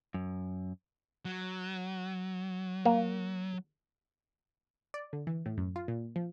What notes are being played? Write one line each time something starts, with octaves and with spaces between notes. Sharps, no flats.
F#2
F#3
A#3
D5
D3
E3
A2
F#2
F4
A#2
F3